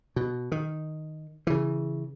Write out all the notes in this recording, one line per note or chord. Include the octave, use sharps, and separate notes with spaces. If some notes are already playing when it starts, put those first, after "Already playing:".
B2
D#3
C#3 E3